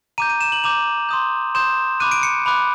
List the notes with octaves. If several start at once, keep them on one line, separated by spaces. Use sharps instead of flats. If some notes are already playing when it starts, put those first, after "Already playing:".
A#5 D6 G6 D#7
D#7
E7
F#7
A#5 D6 G6 F7
C6 D#6 G6
C6 D#6 G6 E7
B5 D6 F#6 D#7
D7
C#7
B5 D6 F#6